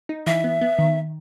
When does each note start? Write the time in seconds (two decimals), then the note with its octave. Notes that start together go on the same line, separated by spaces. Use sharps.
0.09 D#4
0.27 E3 E5
0.44 B3
0.61 B3
0.79 D#3